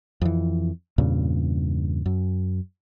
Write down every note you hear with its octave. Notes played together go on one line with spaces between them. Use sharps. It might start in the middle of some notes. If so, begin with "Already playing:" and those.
F2 E3
E2 G2 A#2 C#3
F#2